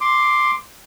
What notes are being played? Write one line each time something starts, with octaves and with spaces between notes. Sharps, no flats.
C6 D6